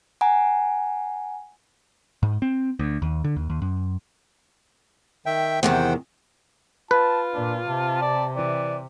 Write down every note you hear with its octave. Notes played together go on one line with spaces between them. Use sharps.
F#5 G#5 A#5
G#2
C4
D2
D#2
D3
D#2
D#2
F#2
D#3 E5 G5
E2 C3 D#3 C5 F#5 G5
F4 B4 A5
A#2 D4
C3 A5
D5
E3 D5